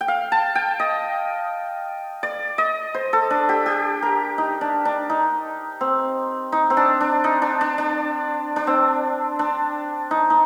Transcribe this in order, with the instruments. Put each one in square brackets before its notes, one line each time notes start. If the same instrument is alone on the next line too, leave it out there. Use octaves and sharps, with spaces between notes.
[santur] G5
F5
A5
G5
D#5
D5
D#5
C5
A4
D4
G4
G4
A#4
D#4
D4
D4
D#4
C4
D#4
C4
D4
D4
D#4
D4
D4
D4
D4
C4
D4
D#4
D#4